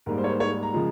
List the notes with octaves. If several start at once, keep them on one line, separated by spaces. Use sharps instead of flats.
G#2 G3 A#3 A#4
C5
C#5
C5
C#5
A#5
C#3 F3 G#3